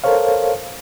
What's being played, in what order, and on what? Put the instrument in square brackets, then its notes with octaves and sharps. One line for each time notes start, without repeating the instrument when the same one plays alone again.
[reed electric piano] A4 A#4 C5 C#5 F5